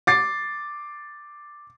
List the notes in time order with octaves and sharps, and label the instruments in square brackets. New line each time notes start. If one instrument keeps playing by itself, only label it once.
[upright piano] D6 A6 C7